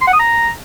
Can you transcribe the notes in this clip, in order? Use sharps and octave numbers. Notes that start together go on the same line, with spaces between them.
C6
F#5
D#6
A#5